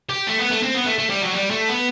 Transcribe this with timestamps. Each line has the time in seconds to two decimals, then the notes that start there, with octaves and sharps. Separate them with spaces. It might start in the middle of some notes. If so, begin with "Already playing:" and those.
0.09 G4
0.27 A3
0.39 B3
0.51 A3
0.63 C4
0.74 B3
0.86 A3
0.98 A3
1.10 G3
1.22 F#3
1.33 G3
1.51 A3
1.69 B3